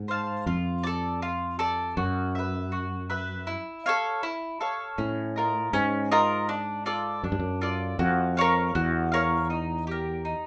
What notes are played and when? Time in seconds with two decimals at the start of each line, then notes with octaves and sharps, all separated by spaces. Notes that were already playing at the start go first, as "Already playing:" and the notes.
Already playing: G#2
0.08 C5 F5 A5
0.46 F2 F4
0.84 A4 D5
1.22 F4
1.59 A4 D5
1.97 F#2 F#4
2.35 B4 E5
2.72 F#4
3.10 B4 E5
3.47 E4
3.86 A4 C#5 F5
4.23 E4
4.61 A4 C#5 F5
4.98 A2 C#4
5.36 F4 A#4 D#5
5.73 G#2 C#4
6.12 F4 A#4 D#5
6.49 D4
6.86 F4 A4 D5
7.24 F#2 D4
7.32 G2
7.39 F#2
7.61 F4 A4 D5
7.99 F2 F#4
8.37 A#4 C#5 F5
8.75 E2 F#4
9.12 A#4 C#5 F5
9.50 D#4
9.87 G4 A#4
10.25 D#4